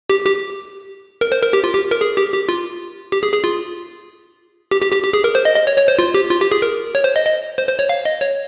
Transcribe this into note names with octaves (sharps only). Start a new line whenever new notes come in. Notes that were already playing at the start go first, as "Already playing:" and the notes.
G4
G4
A#4
C5
A#4
G4
F4
G4
A#4
G#4
G4
G4
F4
G4
G#4
G#4
F4
G4
G4
G4
G4
G#4
A#4
C5
D#5
D#5
C#5
C#5
C5
F4
G4
F4
G4
G#4
A#4
C#5
C5
D#5
D#5
C5
C5
C#5
F5
D#5
C#5